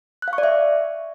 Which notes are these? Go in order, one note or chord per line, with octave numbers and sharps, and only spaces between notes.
F#6
F5
C#6
D5
E5